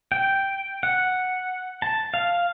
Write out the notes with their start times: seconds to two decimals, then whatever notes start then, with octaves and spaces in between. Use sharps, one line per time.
0.12 G5
0.83 F#5
1.82 A5
2.14 F5